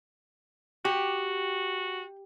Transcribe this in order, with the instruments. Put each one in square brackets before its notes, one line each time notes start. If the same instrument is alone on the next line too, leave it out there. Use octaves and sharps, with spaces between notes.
[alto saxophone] F#4 [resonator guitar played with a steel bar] G4